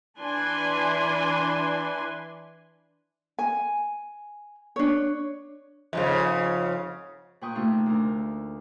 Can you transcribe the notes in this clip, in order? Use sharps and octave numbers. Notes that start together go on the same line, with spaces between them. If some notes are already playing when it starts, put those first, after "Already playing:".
E3 D4 B4 G#5 C6
G#5
D4 C#5
F2 G#2 C#3
A#2 B4 G5 C#6 D#6
C3 A3 A#3 D#4 F4
D2 D3 A#4